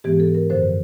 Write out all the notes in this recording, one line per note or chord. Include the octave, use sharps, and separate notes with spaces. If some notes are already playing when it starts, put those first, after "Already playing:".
G#2 E3 G#3 B3 G4
A4
A#4
F#2 D3 F3 C5